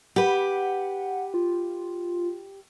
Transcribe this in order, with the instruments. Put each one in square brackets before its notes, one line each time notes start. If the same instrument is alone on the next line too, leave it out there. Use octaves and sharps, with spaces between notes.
[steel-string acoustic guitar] G4 B4 [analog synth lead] F#5
[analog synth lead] F4